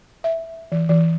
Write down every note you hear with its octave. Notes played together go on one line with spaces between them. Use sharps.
E5
E3
E3